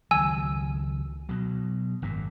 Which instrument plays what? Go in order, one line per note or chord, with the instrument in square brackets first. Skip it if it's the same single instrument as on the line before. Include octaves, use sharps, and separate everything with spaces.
[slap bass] C#2 D#3 F#3 [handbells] G#5 E6
[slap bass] B2 F#3
G#1 F#2 A#2